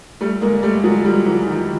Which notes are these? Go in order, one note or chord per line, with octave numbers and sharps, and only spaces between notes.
G3 A3
G#3 A#3
G3 A3
F#3 G#3
F3 G3
E3 F#3
D#3 F3